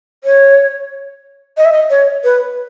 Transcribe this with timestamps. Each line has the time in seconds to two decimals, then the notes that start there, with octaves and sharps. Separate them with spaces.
0.24 C#5
1.57 D#5
1.65 E5
1.72 D#5
1.90 C#5
2.24 B4